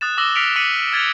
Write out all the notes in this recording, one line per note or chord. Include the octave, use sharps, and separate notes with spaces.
D#6 F#6 A6 E7
D6 E6 A#6 G7
F6 B6 C#7 D7 F7
D6 B6 C#7 D#7 F#7
F6 G#6 A6 B6 C#7 F7